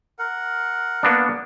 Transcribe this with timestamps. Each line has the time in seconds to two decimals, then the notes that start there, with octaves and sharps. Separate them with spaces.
0.19 A#4 F#5
1.03 A#3 B3 D4